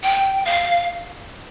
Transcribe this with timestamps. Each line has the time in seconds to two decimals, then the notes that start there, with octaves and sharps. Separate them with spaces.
0.03 G5
0.45 F5